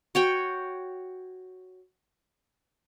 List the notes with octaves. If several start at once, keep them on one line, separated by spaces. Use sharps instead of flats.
F#4 C#5 G5